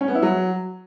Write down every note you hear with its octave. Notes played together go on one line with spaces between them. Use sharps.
C#4
B3
E4
F#3